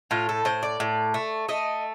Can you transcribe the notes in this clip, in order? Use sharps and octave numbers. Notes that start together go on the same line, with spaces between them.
A2 F4
A4
A2 C5
D5
A2
A3
A3 D#5